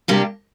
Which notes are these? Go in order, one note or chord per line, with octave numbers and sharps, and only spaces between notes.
C3 G3 A#3 D4 G4